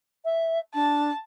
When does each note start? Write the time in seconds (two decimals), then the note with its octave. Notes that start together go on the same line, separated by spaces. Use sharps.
0.24 E5
0.74 D4 A5